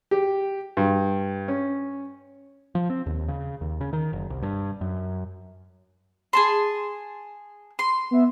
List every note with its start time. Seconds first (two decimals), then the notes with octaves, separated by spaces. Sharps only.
0.11 G4
0.77 G2
1.48 C#4
2.75 F3
2.90 C4
3.06 D#2
3.28 C#3
3.61 D#2
3.81 C#3
3.93 D#3
4.13 F#1
4.30 C2
4.42 G2
4.81 F#2
6.33 G#4 A5 C6
7.79 C6
8.11 B3 E5